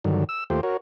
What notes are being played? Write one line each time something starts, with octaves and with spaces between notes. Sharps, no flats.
G2 D3 D#3 F#3
E6
D#2 A3 F4 G4 C5
F#4 A#4 C#5